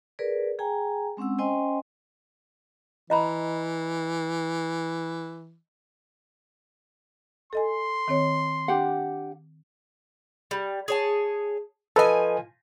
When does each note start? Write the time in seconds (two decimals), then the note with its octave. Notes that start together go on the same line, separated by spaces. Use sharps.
0.19 G#4 A#4 B4 D5
0.59 G#4 G5 G#5 A#5
1.17 G#3 C4 C#4 F#5 E6
1.38 C#4 C5 D#5 G5 G#5 C6
3.10 E3 D#5 A#5 B5
7.53 A4 D#5 G#5 C6
8.08 D#3 C4 C#5
8.68 D4 G4 F#5
10.51 G3
10.88 G#4 C#5 A5
11.96 F3 A4 B4 D#5 G#5